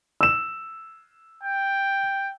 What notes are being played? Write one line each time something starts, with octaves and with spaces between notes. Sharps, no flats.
E6 E7
G5